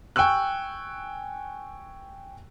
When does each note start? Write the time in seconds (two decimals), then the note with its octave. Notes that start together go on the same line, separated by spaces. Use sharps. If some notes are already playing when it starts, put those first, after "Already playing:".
0.16 G5 G#5 C#6 E6 F#6